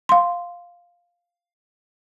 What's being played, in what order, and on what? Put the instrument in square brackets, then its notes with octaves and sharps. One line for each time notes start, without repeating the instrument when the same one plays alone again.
[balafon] F5 C6